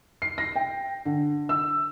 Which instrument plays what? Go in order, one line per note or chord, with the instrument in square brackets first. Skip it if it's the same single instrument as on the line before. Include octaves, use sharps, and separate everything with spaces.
[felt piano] C7
A#6
G5
D3
E6